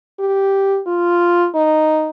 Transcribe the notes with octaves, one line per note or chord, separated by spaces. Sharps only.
G4
F4
D#4